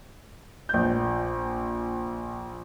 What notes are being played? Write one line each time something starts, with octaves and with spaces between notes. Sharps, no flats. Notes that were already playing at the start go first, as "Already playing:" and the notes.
A#1 G6